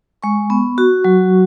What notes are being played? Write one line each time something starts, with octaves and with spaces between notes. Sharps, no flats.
G#3 C#6
B3
F#4
F#3